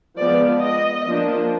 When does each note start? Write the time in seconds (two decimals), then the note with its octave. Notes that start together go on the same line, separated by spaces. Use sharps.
0.18 F3 G#3 B3 D5
0.62 D#5
1.07 F3 A#3 D4